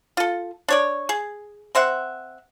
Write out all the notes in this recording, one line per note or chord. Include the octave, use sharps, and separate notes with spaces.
F4 A4
D4 C#5 D5
G#4
C4 C5 E5 F#5